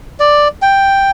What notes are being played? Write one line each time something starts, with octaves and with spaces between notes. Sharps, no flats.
D5
G5